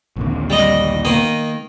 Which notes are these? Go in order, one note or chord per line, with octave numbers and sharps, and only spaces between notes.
A#1 D#2 D3
G3 D#5
D#3 A#3 D#6